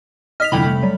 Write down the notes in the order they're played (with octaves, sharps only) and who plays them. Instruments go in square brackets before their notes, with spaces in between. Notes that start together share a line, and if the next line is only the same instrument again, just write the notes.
[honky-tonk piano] D#5 [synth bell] F6 B6 F7
[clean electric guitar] C2 G5 [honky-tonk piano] F2 D3 E3 [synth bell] B5
[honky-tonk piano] A3
[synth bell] F#3 G3